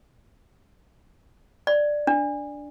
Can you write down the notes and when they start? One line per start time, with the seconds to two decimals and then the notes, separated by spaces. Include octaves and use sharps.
1.67 D5
2.07 D4